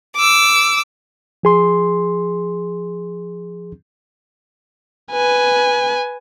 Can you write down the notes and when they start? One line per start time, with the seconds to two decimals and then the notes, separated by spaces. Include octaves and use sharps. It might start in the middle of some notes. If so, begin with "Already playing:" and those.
0.16 D6 E6
1.43 F3 G#4 C6
5.12 B4 G#5